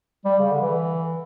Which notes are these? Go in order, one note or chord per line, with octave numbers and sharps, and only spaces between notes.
G3
C#3
D3
E3